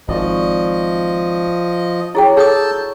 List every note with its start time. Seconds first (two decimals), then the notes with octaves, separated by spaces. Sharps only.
0.09 G#1 F3 F#4 D5 D#5
2.15 F#3 E4 G#4 G5
2.37 G#4 A4 A5 D#6 E6 G6